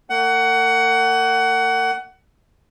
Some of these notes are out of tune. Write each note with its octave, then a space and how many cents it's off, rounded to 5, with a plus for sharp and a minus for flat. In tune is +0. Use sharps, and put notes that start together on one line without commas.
A#3 -45 F#5 +20